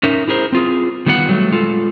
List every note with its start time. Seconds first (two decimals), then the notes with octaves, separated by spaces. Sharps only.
0.03 C#4 D#4 A#4 E5
0.28 E4 G#4 A#4 C5
0.52 C4 F4 G#4
1.06 D#3 G3 B3 F4 G#4 F#5
1.29 F#3 G3 A3
1.52 G#3 F4 A4